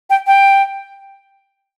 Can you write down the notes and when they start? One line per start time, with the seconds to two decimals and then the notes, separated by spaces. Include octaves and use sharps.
0.10 G5
0.27 G5